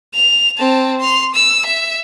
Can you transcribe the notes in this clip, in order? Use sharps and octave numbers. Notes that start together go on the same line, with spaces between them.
F7
C4 A5
C6 F7
E6
E5